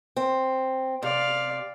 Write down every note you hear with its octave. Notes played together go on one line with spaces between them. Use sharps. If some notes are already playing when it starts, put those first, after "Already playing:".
C4
C3 D5 F5